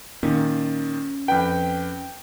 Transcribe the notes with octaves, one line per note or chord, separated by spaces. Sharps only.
A#2 D#3 C#4
F2 B4 G5